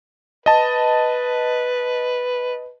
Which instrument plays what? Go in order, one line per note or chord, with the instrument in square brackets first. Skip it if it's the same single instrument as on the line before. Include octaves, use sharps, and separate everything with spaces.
[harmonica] B4 [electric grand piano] D#5 A5